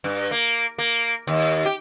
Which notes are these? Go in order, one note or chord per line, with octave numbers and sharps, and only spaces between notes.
G2
A#3
A#3
D#2
G4